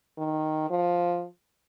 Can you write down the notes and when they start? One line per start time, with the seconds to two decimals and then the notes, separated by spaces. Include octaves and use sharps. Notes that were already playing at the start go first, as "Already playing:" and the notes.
0.18 D#3
0.70 F3